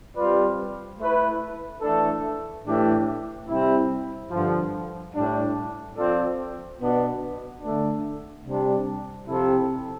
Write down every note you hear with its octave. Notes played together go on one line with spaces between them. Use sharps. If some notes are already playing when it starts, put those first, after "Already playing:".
G3 C4 F4 B4 D5
A3 E4 B4
E3 A3 D4 A4
A2 E3 A3 D4 G4
C3 G3 C4 E4
G2 D3 F3
A2 G3 D4
F3 C4 F4 A4 D5
B2 B3 D4
D3 A3 D4
C3 G3 D4
C3 F3 C4 E4 A4